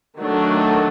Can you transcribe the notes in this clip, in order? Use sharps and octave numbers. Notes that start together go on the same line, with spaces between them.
D#3 F#3 A3 D4